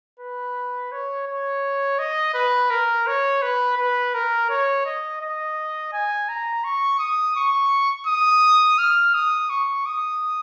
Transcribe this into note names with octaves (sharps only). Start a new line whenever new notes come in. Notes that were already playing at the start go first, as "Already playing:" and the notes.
B4
C#5
C#5
D#5
B4
A#4
C#5
B4
B4
A#4
C#5
D#5
D#5
G#5
A#5
C#6
D#6
C#6
D#6
F6
D#6
C#6
D#6